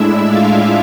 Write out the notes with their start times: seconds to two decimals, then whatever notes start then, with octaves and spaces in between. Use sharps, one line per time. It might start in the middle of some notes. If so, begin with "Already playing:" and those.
Already playing: A2 G#3 D4 E4 E5
0.28 F4 F5